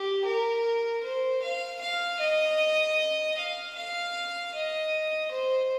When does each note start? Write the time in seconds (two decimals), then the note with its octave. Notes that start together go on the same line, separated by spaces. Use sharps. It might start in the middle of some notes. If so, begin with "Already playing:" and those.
Already playing: G4
0.25 A#4
1.04 C5
1.43 F5
1.81 F5
2.20 D#5
3.37 F5
3.76 F5
4.54 D#5
5.31 C5